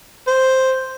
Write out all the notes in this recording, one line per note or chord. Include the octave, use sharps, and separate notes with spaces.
C5